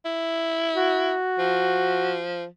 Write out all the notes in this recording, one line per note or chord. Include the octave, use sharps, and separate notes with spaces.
E4
F#4
F3